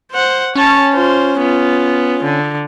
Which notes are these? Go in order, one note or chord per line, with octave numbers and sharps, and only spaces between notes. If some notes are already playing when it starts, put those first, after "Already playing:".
C5 F#5
C#4 C#5 A5
F4 C5
B3 F4
D3